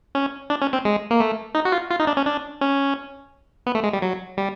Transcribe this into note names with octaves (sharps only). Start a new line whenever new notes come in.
C#4
D4
C#4
C4
G#3
A#3
A3
D#4
F#4
F4
F4
D#4
D4
C#4
D4
C#4
B3
A3
G#3
G3
F#3
G3